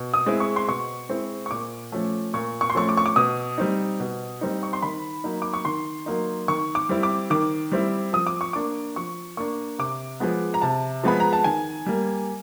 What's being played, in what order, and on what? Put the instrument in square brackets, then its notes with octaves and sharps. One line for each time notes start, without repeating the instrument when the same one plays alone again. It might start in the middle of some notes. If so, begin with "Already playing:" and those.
Already playing: [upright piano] B2
D#6
G#3 C4 E4
C#6
C6
B2 C#6
G#3 C4 E4
C#6
A#2 D6
F3 A3 C#4
A#2 C#6
C#6
C6
F3 A3 C#4 C#6
D6
C#6
D6
B2 D#6
G3 C4 D#4
B2
G3 C4 D#4
C#6
C6
D#3 B5
F#3 A#3 D#4
D6
C#6
D#3 C6
F#3 A#3 D#4
D#3 C#6
D6
G3 C4 E4
D6
D#3 D6
G3 C4 E4
F3 D#6
D6
C#6
A#3 D4 D6
F3 C#6
A#3 D4 C#6
C3 D6
F3 G#3 B3
A#5
C3 A5
F3 G#3 B3 B5
A#5
A5
D#3 G#5
G3 A#3